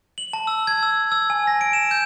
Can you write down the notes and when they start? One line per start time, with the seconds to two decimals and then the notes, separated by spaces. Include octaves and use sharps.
0.18 F#7
0.33 A5
0.47 E6
0.67 G#6
0.83 E6
1.12 E6
1.30 G#5
1.47 A#6
1.61 D7
1.73 E7
1.91 G6